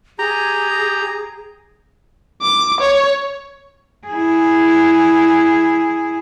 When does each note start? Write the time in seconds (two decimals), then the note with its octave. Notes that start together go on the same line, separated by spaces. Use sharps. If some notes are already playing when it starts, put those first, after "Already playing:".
0.19 G4 G#4 A#5
2.42 D6
2.80 C#5
4.07 E4 G#4